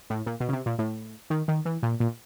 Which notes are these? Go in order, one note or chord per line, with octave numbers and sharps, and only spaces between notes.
A2
A#2
B2
C#3
C3
A#2
A2
D#3
D#3
E3
A#2
A#2